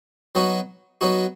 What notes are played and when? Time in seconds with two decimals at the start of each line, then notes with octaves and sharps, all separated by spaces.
0.35 F#3 B3 D#4 F#4
1.01 F#3 B3 D#4 F#4